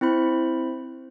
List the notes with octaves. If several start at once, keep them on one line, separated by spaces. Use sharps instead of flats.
C4 E4 C5 B5